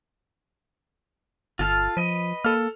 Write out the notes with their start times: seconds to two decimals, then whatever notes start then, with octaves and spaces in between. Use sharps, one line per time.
1.59 G1 F4 A4 F5
1.97 F3 B4 D#5
2.45 A#3 A4 F6